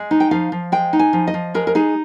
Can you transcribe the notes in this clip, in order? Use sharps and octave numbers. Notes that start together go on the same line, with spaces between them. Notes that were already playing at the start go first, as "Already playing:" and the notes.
Already playing: G#3
D#4
G5
F3 F5
F3
G#3 G5
D#4
G#5
F3
D#5
F3
G#3 A#4
A#4
D#4 G#4